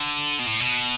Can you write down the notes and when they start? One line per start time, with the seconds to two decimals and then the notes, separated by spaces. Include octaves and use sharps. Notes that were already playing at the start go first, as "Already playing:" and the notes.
Already playing: D3
0.39 B2
0.46 A2
0.61 B2